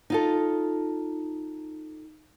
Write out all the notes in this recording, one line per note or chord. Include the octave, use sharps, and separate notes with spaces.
D#4 F4 A4